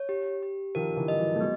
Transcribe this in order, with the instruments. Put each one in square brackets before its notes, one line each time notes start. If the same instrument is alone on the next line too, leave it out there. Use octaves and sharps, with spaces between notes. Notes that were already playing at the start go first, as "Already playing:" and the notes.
Already playing: [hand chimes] C#5
G4
G4
[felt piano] D#3 F3 [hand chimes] A#4
[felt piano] D3 E3
[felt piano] G3 [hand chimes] D#5
[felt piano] E3 F#3
A3
[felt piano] F#3 G#3 [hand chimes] B3